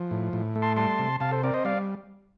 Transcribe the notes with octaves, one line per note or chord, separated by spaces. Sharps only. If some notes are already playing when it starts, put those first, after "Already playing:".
Already playing: F3
A2
A2
A3
A5 C6
G3 A5 C6
C3
C3 F5 A5
A4 C5
C4 A#4 D5
C5 D#5
G3 D5 F5